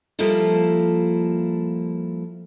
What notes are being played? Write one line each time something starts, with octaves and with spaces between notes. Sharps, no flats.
F3 G3 A#3 E4 F4 A4